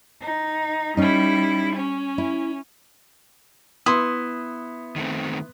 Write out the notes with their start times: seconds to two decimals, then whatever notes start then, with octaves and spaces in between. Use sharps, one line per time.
0.20 D#4
0.97 G3 C#4 D#4 E4
1.75 C#4
2.18 E4
3.86 B3 E4 C6 D#6
4.96 D#3 A3 C4